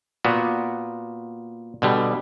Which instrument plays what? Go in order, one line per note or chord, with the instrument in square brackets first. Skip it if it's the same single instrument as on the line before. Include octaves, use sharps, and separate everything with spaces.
[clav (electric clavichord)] A#2 B3 F#4
B2 D3 G3